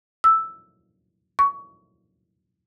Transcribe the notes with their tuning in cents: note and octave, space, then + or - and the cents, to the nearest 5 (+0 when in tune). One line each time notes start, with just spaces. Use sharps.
E6 +0
C#6 +20